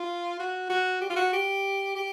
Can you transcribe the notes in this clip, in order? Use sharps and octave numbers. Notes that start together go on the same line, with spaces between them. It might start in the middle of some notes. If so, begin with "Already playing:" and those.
Already playing: F4
F#4
F#4
G4
F4
F#4
G4
G4